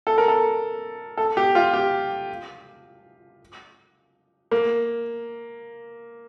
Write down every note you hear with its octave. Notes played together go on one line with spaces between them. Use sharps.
A4
A#4
A4
A4
G4
F4
G4
A#3